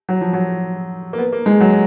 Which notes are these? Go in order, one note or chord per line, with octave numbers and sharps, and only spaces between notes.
F#3
F3
F#3
A#3
B3
A#3
G#3
F#3